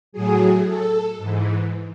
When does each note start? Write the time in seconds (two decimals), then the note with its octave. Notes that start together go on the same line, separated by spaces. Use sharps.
0.12 A2 F#3 G#4
0.64 A4
1.18 G#2 E3